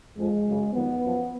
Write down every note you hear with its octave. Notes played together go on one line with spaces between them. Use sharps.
F2 F3 G#3
F#2 C#3 F#3
F2 D#3 F#3 B3
F#2 F3